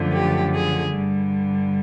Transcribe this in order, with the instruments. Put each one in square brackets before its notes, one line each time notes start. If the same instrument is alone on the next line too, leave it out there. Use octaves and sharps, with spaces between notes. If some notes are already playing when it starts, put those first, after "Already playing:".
Already playing: [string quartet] F#2 D3 F3 A3
G4
G#4
G2 D3 G3